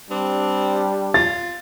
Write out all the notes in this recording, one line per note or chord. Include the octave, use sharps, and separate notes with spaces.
G3 C4 D4
F4 A6